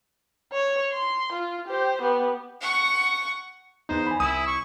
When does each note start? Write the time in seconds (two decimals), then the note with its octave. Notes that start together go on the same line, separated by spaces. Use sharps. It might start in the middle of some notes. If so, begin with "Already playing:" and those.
0.52 C#5
0.92 C6
1.32 F4
1.68 G4 C5
2.01 B3 G4
2.61 F#5 C#6
3.89 E2 B3 D#4 C5
4.07 G#5 B5
4.20 C2 E4 D#6
4.47 C#6